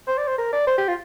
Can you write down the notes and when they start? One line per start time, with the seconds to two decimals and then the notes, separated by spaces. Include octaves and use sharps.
0.08 C5
0.18 D5
0.28 C5
0.38 A#4
0.53 D5
0.67 C5
0.78 G4
0.88 F4